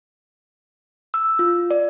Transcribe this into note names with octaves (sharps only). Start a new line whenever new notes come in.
E6
F4
D5